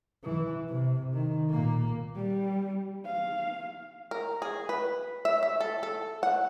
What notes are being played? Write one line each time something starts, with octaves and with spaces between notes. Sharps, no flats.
E3
C3
D#3
A#2 A#3
G3
F5
A#4
G#4
B4
E5
E5
A4
A4
F#5